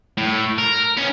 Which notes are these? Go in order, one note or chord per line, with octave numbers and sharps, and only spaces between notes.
A2
A#4
B3 C#4